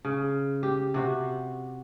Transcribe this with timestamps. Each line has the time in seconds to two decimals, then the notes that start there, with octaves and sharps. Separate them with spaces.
0.05 C#3
0.63 G4
0.94 C3 F#4 G4